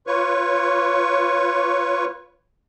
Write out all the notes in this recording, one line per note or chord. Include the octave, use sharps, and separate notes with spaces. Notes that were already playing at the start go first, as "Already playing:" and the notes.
F4 B4 C#5 C#6